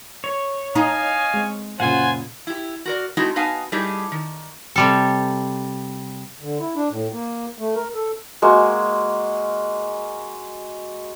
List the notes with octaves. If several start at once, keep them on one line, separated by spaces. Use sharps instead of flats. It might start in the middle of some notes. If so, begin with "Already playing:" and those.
C#5
D#4 D#5 F5 G#5
G#3 C4
F#2 A#2 C#3 F4 C5 F#5 G#5
E4 G4
F#4 A#4 D5
G#3 A3 C4 D#4 E4 F#4
B3 D#4 F5 G#5 A5
G3 A3 D#4 E4 G4 G#4
D#3
C3 G3 A4
D3
E4
D4
A2
A#3
A3
A#4
A4
G#3 A#3 F#4